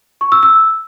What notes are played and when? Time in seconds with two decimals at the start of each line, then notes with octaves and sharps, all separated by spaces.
0.21 C#6
0.32 E6
0.43 E6